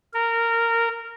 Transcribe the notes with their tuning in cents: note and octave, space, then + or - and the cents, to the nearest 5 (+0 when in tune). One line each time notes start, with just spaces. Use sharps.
A#4 -15